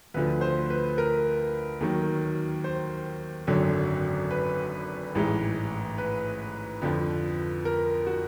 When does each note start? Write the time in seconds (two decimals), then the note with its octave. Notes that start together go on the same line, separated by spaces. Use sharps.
0.14 D2 D3 F3 B4
0.41 C5
0.70 B4
0.98 A#4
1.81 D#2 D#3 F#3
2.64 C5
3.47 G#1 F#2 D3 F#3
4.31 B4
5.15 A1 G#2 E3 G#3
5.98 B4
6.82 F2 D3 F3
7.65 A#4
8.07 F#4